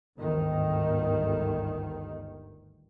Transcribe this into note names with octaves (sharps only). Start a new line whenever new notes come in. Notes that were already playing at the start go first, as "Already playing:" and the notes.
G1 D2 G#2 D#3